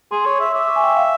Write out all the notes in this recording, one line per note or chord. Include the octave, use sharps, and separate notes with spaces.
G#4 C6
C#5
E5
E5 D6
C#6
G#5
G5
F5